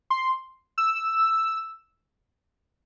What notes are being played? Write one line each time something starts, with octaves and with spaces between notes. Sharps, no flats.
C6
E6